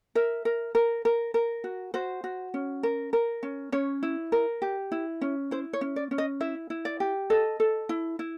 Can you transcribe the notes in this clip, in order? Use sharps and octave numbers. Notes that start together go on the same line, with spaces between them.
A#4 E5
A#4
A#4
A#4
A#4
F#4
F#4 C5
F#4
C#4
A#4
A#4
C#4
C#4 C#5
E4
A#4
G4
E4
C#4
E4 C5
C#5
C#4
D5
C#4
D#5
E4 E5
E4
D5
G4
A4 D#5
A4
E4
E4